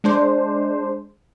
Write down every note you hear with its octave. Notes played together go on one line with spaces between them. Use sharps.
G#3 D4 C5